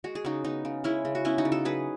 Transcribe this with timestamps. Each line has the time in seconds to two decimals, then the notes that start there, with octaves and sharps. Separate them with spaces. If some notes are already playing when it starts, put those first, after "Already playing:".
0.04 G#3 F#4
0.15 G#4
0.25 C#3 D#4 F#4
0.44 B3 D#4
0.65 C#3
0.84 G#3 C#4 E4
1.05 C#3
1.15 F#4
1.25 B3 C#4 E4
1.38 D#4 F#4
1.45 C#3
1.52 F#4 A4
1.65 F#3 G#4 B4